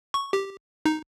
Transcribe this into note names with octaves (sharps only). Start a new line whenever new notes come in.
C#6
G4
D#4